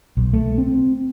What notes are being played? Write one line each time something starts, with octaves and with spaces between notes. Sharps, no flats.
B1
A3
C4